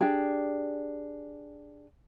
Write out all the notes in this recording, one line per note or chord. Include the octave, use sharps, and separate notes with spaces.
D4 G4 G#4